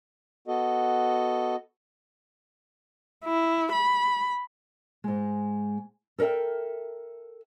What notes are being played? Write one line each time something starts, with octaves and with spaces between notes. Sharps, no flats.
B3 F#4 A4 D#5
E4
B5
G#2 G#3
A4 A#4 D#5 E5 G5